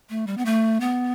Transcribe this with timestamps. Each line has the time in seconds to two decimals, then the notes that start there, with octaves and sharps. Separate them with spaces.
0.10 A3
0.27 G3
0.37 B3
0.45 A3
0.80 B3